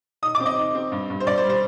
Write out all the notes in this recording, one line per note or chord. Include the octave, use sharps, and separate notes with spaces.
D#4 D#6
D6
C4
D#5
D#4
C4
G2
G2
C5
G2 D5
C5
G3
C5